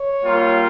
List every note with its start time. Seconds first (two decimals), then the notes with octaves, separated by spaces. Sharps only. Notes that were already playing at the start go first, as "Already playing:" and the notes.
Already playing: C#5
0.23 G3 A#3 F4